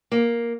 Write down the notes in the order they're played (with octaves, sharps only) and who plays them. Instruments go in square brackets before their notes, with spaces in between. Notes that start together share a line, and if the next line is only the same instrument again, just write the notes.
[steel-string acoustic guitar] A#3